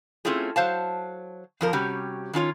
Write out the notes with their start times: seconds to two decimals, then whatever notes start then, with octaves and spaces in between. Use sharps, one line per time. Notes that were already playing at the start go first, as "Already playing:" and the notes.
0.25 A3 C4 C#4 E4 F4 G#4
0.56 F#3 C5 F5 A5
1.61 F2 F3 A#4
1.73 C3 G3 C#4 F#4 G4
2.33 D#3 C#4 F4 C#5